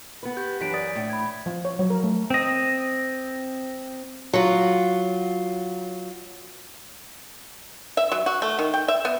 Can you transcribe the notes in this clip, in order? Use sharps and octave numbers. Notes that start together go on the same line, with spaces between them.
B3 B4
G4 G6
F#2 E3 D4 B6 D7
D5 D#6 A6
A2
B5 G#6
F3
C#5
F#3
A#4
A3
C4 D#5
F#3 F4
E5
F#3
F#4
A3
D#3
G5
E5
B3